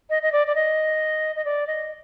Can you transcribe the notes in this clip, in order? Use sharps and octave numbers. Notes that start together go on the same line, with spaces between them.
D#5
D#5
D5
D5
D#5
D#5
D5
D#5